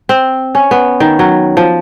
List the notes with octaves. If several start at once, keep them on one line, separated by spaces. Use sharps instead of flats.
C4
C#4
B3
D#3
F#3
F3